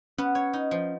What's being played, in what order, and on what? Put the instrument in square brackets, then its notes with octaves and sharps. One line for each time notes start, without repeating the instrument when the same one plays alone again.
[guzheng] B3 [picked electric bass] C#4
[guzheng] C#5
D#4
F3